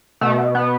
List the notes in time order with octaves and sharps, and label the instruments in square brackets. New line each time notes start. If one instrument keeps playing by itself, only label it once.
[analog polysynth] B2 A3
B2
B2 B3